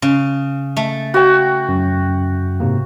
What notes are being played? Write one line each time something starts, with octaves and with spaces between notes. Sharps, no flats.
C#3
A3
F#4 G5
F#2
G#2 C3 A#3